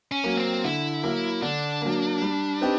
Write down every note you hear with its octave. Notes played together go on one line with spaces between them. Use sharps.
C#4
F#3 A#3
C4
D3 E4
F#3 A#3
D3 D4
F#3 A#3
G3
C4 D#4 G4 B4